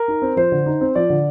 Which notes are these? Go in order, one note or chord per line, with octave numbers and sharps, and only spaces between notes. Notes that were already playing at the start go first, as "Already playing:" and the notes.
Already playing: A#4
D#4
C4
F3 C5
D3
D#4
C4
F3 D5
D3